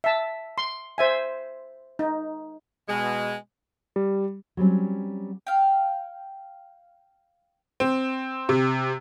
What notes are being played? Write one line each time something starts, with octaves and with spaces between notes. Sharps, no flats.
E5 A5
C6
C5 E5 G#5
D#4
B2 G#3
G3
F#3 G3 C4 C#4
F5 G5
C4
C3